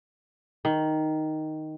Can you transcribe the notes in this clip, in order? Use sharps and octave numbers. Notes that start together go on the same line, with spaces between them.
D#3